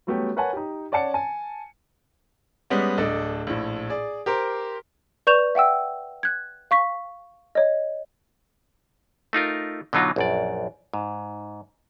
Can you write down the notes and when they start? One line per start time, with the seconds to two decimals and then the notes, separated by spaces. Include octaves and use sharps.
0.07 F#3 G3 A3 B3 C#4 G4
0.36 A#4 B4 C#5 F#5 G#5 A5
0.53 D#4 G4
0.92 C#4 D5 F#5 A5 C#7
1.14 G#5 A5
2.70 G3 G#3 B3 C#4
2.98 D1 D4 A4 D#5
3.47 A#1 A2
3.90 G#4 D5
4.26 G4 A#4 C5
5.27 B4 D5 C#6 G6 E7 F7
5.55 E5 F#5 G5 E6
6.23 F#6 G#6
6.71 F5 C#6 B6
7.55 C#5 D#5
9.33 A3 D#4 F4 A#4
9.93 B2 D3 F#3 D#4 F4
10.16 A#1 F#2 D5
10.94 G#2